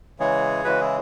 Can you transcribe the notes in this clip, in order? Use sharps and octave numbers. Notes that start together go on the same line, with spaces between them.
C#3 E3 G#3 G#4 C#5
C#3 E3 G#3 F#4 B4
E4 G#4